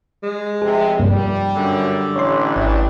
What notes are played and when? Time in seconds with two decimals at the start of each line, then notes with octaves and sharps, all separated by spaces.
0.23 G#3
0.62 F1 C3 G#4
1.00 G2 C3 G3 A#3
1.55 F#2 D3
2.16 A1 C#5 C6
2.56 G#1 E2 E3 G3 D4